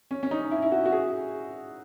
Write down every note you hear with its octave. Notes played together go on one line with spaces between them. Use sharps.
C#4
C#4
D#4
E4
E4
F#4
F#4
G#4